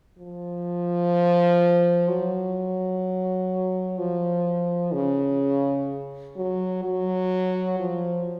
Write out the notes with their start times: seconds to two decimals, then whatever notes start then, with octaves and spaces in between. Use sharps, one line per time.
0.18 F3
2.08 F#3
3.98 F3
4.94 C#3
6.37 F#3
6.84 F#3
7.80 F3